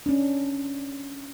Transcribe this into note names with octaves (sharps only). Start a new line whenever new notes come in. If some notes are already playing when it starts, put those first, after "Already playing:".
C#4 D4